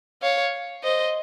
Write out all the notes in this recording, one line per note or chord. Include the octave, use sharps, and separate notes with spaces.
C#5 F5
C5 D#5